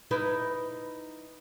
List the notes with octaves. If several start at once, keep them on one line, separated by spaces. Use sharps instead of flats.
D#4 E4 B4